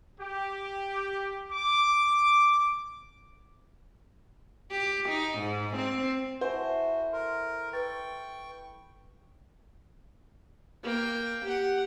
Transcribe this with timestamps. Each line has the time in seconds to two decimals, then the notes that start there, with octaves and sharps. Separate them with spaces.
0.19 G4
1.51 D6
4.72 G4
5.09 D#4
5.38 G#2
5.76 C4
6.41 E4 F#4 A4 C5 E5 F#5 G#5
7.13 A#4 C6
7.73 B4 G5 C#6 A6
10.83 A#3 G5
11.44 G4 F#5